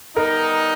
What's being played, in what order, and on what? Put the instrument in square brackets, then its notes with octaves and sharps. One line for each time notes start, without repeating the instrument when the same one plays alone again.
[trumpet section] G3 B3 D#4 [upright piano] A#4